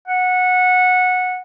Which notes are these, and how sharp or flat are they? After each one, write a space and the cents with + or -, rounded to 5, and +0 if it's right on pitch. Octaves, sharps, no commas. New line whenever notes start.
F#5 -15